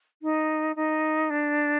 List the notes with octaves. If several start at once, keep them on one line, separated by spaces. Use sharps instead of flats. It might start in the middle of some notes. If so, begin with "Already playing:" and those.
D#4
D#4
D4